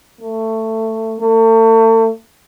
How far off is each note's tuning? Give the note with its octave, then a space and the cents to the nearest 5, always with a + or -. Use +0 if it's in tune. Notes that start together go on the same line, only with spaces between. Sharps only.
A3 +15
A3 +40